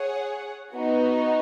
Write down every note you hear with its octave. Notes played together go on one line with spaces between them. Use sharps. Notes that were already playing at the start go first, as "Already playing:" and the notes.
Already playing: G#4 C#5 F#5
B3 D#4 F#4